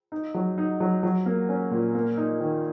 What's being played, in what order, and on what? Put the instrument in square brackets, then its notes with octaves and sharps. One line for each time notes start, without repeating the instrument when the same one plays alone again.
[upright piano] D#4
F#3
D#4
F#3
F#3
A#3
C#4
A#2
A#3
D#4
D#3